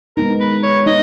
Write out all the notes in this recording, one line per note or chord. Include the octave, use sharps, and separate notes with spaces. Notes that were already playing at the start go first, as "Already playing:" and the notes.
G#3 B3 D#4 A#4
B4
C#5
B3 D#4 D#5